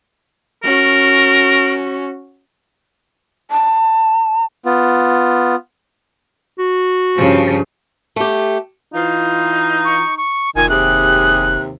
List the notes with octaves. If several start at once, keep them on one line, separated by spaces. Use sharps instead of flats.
C#4 F#4 A#4
A5
B3 F4
F#4
G2 C#3 F3
A3 G4
E3 D#4 F4
C#6
C#6
F1 A#2 D#3 G#5
D#2 C3 G#4 F#6